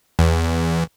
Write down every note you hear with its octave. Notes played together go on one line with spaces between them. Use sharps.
E2